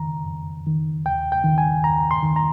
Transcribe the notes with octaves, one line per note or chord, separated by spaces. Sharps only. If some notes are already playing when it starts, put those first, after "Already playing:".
Already playing: F2 D#3 A#5
F2
D#3
D#2 G5
G5
D#3
G#5
D#2 A#5
C6
D#3
A#5